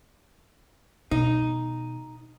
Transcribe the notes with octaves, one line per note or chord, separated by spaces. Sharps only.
B2 D#3 D#4